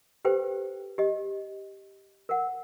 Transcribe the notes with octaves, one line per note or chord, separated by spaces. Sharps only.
G4 A4 B4 C5 G5
G4 D#5
A#4 F#5